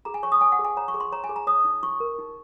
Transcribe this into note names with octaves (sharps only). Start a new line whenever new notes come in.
G#4 A#5
G#5
C#5 C#6
D#6
C#5 G#5
F#5
G#4
G#5
C#5 A#5
C#6
G#4
C6
C#5 A#5
G#5
G#4
A#5
C#5 D#6
D#4
D#4 C#6
A#4
D#4